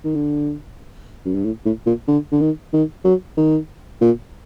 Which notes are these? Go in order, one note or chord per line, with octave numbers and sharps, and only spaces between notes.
D#3
D3
F#2
G2
A2
A2
A#2
D3
D3
D#3
D#3
F#3
D#3
A#2